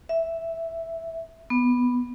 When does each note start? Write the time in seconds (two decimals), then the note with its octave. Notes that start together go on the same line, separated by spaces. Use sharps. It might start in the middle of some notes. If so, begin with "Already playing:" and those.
0.09 E5
1.50 B3